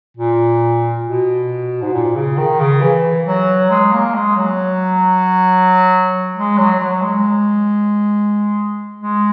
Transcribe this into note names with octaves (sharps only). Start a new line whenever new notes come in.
A#2
B2
G#2
A#2
C#3
D#3
C#3
E3
F#3
G#3
A#3
G#3
F#3
G#3
F#3
F#3
G#3
G#3